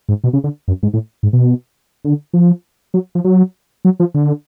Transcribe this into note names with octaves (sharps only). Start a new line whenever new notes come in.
G#2
B2
C#3
D3
F#2
G#2
A2
G#2
B2
D3
F3
F#3
F3
F#3
F#3
F3
D3